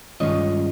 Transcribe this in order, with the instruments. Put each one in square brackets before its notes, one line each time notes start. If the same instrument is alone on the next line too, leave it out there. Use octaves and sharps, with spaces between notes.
[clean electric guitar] G2 D#3 G#3 C#4 F4 C#5 D#5